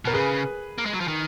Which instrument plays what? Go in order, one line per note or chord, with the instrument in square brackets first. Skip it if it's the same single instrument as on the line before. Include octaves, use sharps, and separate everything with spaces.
[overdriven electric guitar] B2 [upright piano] A#4
[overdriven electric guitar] C#3 [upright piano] G#4 B4
[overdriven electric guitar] A#3
G#3
F#3
F3
D#3